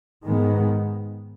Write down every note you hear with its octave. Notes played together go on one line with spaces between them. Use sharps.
G#2 D#3 G#3 B3